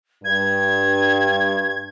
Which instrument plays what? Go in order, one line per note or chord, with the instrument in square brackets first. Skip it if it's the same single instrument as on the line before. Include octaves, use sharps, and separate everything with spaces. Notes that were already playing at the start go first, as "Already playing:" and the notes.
[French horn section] G2 [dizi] G#6